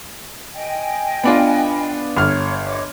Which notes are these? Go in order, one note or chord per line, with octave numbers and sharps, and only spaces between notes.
D#5 G5 G#5
B3 D4 F4
G1 C#5 F6
C#5 D#5 D6